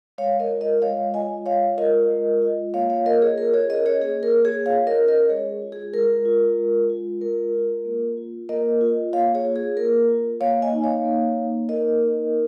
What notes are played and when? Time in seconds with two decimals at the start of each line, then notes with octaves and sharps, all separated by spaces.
0.18 G#3 C#5 F5
0.40 A#4 D#5
0.50 F4
0.61 A#4 D#5
0.82 G#3 C#5 F5
1.14 F4 D#5 G#5
1.46 G#3 C#5 F5
1.78 F4 A#4 D#5
2.10 G#3
2.42 F4
2.74 A#3 C#5 F5
2.90 C#5 F5
3.06 A#3 A#4 D#5
3.22 G#4 C#5
3.38 F4 A#4
3.54 G#4 C#5
3.69 C#4 A#4 D#5
3.86 G#4 C#5
4.01 A#3 G#4
4.23 A#4
4.34 A#3
4.44 G#4 C#5
4.66 F4 C#5 F5
4.87 A#4 D#5
4.98 C#4
5.08 A#4 D#5
5.30 G#3 G#4 C#5
5.62 F4
5.72 G#4
5.94 G#3 A#4
6.25 F4
6.58 G#3
6.89 F4
7.21 G#3 A#4
7.54 F4
7.85 A#3
8.17 F4
8.49 A#3 A#4 D#5
8.81 F4
9.13 A#3 C#5 F5
9.34 G#4 C#5
9.45 F4
9.56 G#4
9.77 A#3 A#4
10.09 F4
10.41 A#3 C#5 F5
10.62 D#5 G#5
10.73 D#4
10.84 C#5 F5
11.05 A#3
11.37 D#4
11.69 A#3 A#4 D#5
12.01 D#4